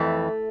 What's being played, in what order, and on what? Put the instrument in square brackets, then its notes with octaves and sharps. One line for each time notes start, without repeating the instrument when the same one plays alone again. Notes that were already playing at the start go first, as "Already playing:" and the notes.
Already playing: [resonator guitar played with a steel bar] F2 E3 A3